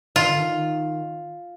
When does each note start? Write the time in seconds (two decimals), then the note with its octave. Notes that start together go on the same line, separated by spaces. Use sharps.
0.15 D#3 F4
0.27 D3
0.39 D#3